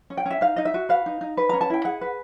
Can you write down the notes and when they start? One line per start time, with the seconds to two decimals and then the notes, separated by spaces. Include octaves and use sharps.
0.10 C#4
0.17 G5
0.26 C#4 E5
0.41 D#4 F5
0.56 D#4 D#5
0.65 E5
0.74 F#4
0.89 B4 F5
1.06 D#4
1.21 D#4
1.37 B4
1.49 C#4 A#5
1.61 A5
1.70 E4 G5
1.85 G#4 F#5
2.01 B4